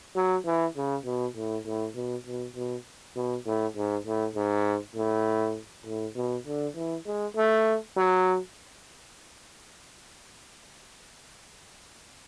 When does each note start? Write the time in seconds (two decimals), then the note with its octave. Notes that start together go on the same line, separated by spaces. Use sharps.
0.16 F#3
0.45 E3
0.76 C#3
1.06 B2
1.36 A2
1.66 A2
1.95 B2
2.26 B2
2.55 B2
3.16 B2
3.46 A2
3.76 G#2
4.06 A2
4.36 G#2
4.95 A2
5.86 A2
6.16 B2
6.46 D3
6.76 E3
7.06 G#3
7.36 A3
7.96 F#3